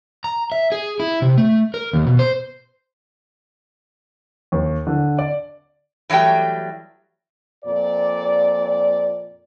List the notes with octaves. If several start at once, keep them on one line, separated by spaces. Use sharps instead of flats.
A#5
E5
G#4
E4
C3
A3
A#4
D#2
B2
C5
D#2
D3
D5
E3 F#3 G3 A3 G5
F2 A#2 D5